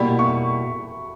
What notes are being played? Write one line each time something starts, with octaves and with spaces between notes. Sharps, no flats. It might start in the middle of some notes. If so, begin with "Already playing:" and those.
Already playing: B2 G3 A#3 E4 G4 B5
C#6